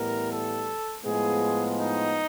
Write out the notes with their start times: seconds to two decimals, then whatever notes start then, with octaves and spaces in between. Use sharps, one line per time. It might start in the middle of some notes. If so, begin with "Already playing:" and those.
Already playing: A2 E3 G3 B3 A#4
0.31 A4
1.05 A2 F3 G#3 B3 G#4
1.79 D#4